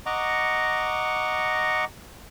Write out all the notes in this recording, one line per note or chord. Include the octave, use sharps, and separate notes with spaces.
D#5 F#5 A#5 C#6 D6